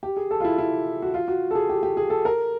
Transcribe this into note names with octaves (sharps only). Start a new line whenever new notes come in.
G4
G#4
A4
F4
E4
E4
F#4
F4
F#4
A4
G#4
G4
G4
G#4
A4
A#4